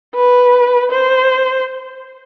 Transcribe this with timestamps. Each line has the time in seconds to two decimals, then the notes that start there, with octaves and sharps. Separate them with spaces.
0.15 B4
0.91 C5